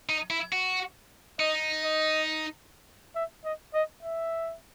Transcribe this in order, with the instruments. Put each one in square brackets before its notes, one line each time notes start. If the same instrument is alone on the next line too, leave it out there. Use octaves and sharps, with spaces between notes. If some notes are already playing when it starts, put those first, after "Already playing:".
[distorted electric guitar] D#4
E4
F#4
[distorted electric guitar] D#4 [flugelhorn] D#5
[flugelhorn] D#5
E5
D#5
D#5
E5